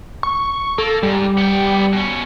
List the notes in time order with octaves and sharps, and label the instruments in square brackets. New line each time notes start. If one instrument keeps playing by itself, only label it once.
[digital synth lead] C#6
[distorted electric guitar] A#3 [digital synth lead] A4
[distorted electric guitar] G#2 [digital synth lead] G3
[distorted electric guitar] B3 G5
B2 C#4